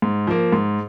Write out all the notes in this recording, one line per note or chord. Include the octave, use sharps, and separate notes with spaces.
G#2
F3 A#3
G#2